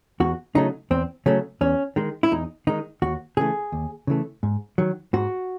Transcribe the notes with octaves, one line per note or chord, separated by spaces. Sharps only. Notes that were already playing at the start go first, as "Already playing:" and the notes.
E2 F#4
C#3 F#3 A3 D#4
E2 C4
C#3 F#3 A3 C#4
E2 C#4
D#3 G#3
E4
E2 D#4
D#3 G#3 D#4
D#2 F#4
C#3 E3 A3 G#4
D#2
C#3 E3 A3
G#2
D#3 F#3
G#2 F#4